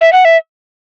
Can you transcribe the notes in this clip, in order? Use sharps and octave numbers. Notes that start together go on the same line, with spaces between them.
E5
F#5
E5